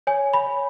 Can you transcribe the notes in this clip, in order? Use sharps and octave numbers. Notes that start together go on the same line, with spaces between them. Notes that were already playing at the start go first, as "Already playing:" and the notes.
C#5 G#5
B5
C#5